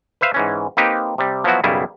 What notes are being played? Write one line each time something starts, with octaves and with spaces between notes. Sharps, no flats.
B4 C5 E5 F5
G#2 E3 C#4
A#3 C4 D#4 G4 B4
C3 G3
F3 F#3 B3 E4 F#4
B1 F#2 C#3 G3 E4 G#4